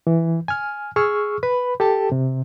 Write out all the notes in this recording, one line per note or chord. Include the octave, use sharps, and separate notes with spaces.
E3
G#5 F6
G#4 C#6 E6 F6
B4 B5
G4 A4 G5 A5
C3